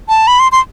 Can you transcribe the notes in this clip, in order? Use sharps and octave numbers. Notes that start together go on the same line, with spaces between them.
A5
B5
C6
C6